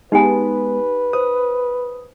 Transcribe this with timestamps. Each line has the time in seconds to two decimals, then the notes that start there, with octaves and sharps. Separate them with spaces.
0.12 G#3 B3 D#4 G4 B4 G#5
1.13 C5 D#6